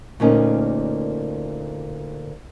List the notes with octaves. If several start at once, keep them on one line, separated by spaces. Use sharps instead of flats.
D2 A#2 A#3 C#4 D#4